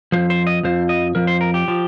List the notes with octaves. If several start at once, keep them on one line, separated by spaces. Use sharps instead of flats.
F2 F3 C5
C5
D#5
F2 F3 C5
D#5
F2 F3 A#4
C5
A#4
G4
F3